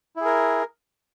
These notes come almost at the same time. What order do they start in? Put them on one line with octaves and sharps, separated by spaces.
E4 G#4 A#4